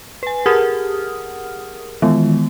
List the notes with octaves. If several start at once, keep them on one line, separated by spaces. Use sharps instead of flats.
B4 G#5
G4 G#4 A#4 F#5 D#6 F6
D#3 E3 G#3 B3